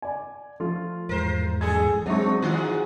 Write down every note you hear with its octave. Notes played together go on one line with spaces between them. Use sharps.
D5 G#5
F3 A3 F4
E2 G#2 A#4 C5
F2 G#4 A4 G#6
F#3 G#3 C4 D4 D#4 E5 C#6
G#2 D#3 F3 F4 F#4 F#5